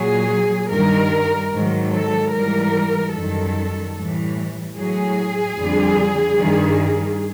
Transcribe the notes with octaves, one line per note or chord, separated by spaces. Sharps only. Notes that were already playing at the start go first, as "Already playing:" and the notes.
Already playing: A#2 F#3 G#4
G2 D#3 G3 A#4
G#2 D#3 F#3
A4
G#2 E3 G3 A#4
F#2 D#3 G3 A4
A2 E3 G3
A2 F#3 G#4
F2 D3 G3
G2 D#3 G3